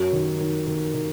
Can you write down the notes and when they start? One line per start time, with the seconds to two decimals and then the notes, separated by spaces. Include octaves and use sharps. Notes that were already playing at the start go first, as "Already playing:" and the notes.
Already playing: F#2 F#3
0.13 D#3
0.40 D#3
0.67 D#3
0.94 D#3